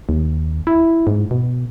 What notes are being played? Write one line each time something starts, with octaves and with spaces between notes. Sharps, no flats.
D#2
E4
G#2
B2